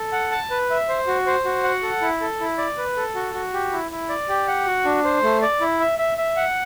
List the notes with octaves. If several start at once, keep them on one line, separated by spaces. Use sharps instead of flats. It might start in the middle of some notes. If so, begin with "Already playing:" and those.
Already playing: A4
F#5
A5
B4
E5
C5
F#4
C5
F#4
F#5
A4
E4
A4
E4
D5
B4
A4
F#4
F#4
G4
E4
E4
D5
G4
F#5
F#4
D4
C5
A3
D5
E4
E5
E5
E5
F#5